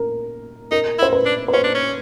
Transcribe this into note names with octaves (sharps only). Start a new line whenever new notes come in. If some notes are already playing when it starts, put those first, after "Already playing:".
Already playing: A#4
D#4 A#4
E4
C5
B4
D4
B4
C#4 C5
D4
C#4